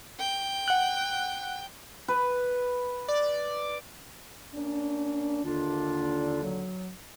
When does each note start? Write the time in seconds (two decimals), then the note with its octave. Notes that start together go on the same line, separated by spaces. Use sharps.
0.19 G5
0.68 F#5 F#6
2.08 B4
3.08 D5
4.55 A#3 C#4 D4
5.44 D#2 D3 D4 F4
6.43 F#3